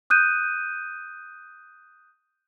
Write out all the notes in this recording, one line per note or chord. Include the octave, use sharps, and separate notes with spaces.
D#6 F#6 G6 D#7